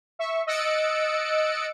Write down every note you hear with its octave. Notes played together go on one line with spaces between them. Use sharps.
E5 C#6
D#5 E6 F#6 A6 C#7 D7